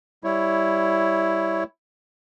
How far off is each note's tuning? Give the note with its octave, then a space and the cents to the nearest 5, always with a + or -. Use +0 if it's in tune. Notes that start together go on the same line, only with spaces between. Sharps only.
G3 +0 E4 +0 C#5 +0